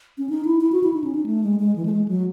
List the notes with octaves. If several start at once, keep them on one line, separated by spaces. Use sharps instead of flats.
C#4
D#4
E4
E4
F#4
E4
D#4
C#4
D#4
A3
G#3
G#3
E3
A3
G#3
F#3